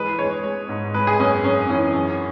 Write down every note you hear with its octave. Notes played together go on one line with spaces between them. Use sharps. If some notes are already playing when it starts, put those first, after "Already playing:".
Already playing: E3 G#3 B4
G#3 C#5
G#3
G#2
G#3 B4
G#4
F#2 C#4
F#2 C#4
E3 C#4
F#2